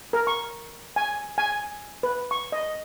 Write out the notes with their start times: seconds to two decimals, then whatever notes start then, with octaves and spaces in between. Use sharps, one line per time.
0.13 A#4
0.27 C#6
0.96 G#5
1.38 G#5
2.03 B4
2.31 C#6
2.52 D#5